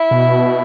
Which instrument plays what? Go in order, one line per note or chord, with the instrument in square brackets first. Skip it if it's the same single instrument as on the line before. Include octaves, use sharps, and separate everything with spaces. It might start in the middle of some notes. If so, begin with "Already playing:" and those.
Already playing: [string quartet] E4
[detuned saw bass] B2